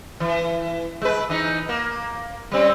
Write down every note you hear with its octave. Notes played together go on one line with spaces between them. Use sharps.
E3
G#3 B4
E3 D#4
A#3
G3 C4 C#4